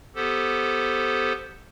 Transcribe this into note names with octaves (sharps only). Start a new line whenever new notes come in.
B3 G4 A4 C5